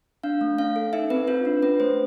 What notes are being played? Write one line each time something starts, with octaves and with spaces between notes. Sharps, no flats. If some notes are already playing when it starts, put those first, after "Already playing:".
D4 F5
A3
C#4 F5
A4
D#4 E5
C4 B4
F4 B4
D4
C#4 B4
A3 C5